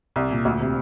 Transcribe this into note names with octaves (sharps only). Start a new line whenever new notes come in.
C2
A#2
D2
C3